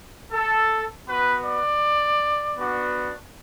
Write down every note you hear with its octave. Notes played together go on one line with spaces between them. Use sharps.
A4
B3 F#4 B4
D5
B3 D4 F#4